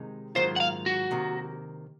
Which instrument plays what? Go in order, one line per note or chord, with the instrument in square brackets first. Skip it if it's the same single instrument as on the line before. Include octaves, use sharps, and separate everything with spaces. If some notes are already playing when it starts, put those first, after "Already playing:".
Already playing: [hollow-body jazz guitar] C3 D#3 G#3 D#4
[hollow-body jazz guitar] G#2 D#3 F#3 A#3 F4 [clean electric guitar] C5
[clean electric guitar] F#5
F5
F#4
[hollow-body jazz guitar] C3 D#3 A#3